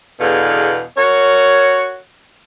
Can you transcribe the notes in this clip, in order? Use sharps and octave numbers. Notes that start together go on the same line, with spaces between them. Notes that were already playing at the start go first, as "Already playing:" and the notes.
E2 B2 D3 G#4 F5
F#4 A#4 C#5